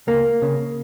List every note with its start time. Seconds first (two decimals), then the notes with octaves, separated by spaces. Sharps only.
0.07 C#2 A#3
0.42 C#3